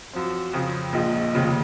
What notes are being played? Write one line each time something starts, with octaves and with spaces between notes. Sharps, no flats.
F#2 F3 C4
F2 C#3 F3
A#1 A#2 F3 G#3 D#4
F1 D#2 C#3 F3